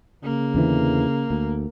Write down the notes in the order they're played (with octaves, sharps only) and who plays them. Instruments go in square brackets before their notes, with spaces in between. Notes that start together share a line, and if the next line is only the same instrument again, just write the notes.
[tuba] C#3 [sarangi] A#3
[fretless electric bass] E2 D3 E3
D2